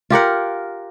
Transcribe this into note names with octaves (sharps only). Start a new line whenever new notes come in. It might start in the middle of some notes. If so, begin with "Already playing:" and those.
F4 G4 A#4 F#5